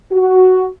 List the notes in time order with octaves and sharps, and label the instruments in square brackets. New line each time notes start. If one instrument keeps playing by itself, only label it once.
[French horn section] F#4